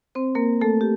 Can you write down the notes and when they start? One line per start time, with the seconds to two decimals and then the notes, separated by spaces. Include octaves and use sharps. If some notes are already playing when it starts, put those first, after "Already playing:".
0.15 C4 C5
0.35 A#3 A#4
0.61 A3 A4
0.81 G4